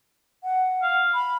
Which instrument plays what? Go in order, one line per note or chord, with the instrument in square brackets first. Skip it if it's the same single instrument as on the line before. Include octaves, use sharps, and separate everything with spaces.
[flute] F#5
[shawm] F5
[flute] B5